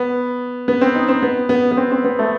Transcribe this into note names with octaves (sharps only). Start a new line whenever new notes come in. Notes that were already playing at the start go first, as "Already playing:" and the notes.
Already playing: B3
B3
C4
D#4
C4
B3
B3
B3
C4
C4
B3
A3